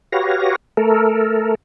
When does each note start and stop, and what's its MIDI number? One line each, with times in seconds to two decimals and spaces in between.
0.12 0.56 66
0.12 0.56 67
0.12 0.56 71
0.12 0.56 73
0.12 0.56 77
0.12 0.56 94
0.77 1.55 57
0.77 1.55 69
0.77 1.55 70